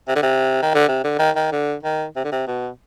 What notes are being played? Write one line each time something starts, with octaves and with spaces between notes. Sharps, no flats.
C3
D3
C3
D#3
D3
C3
D3
D#3
D#3
D3
D#3
C3
D3
C3
B2